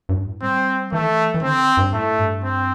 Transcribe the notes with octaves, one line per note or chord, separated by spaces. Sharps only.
G2
A2
G3 C4
E3 A3
E3
D3 C4
G2
A2 A3
G2
C4